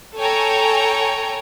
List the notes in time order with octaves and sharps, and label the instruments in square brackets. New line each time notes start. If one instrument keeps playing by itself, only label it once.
[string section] A4 C#5 G5 G#5 A#5